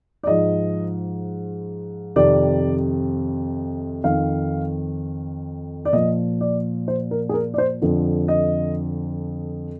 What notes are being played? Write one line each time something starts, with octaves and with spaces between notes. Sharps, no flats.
D5
G#2 F3 D#5
F2 C3 D#3 D5
F2 D#3 F5
D5
A#2 F3 D#5
D5
C5
A#4
G#4
A#4
D5
C5
F2 D3 F3
D#5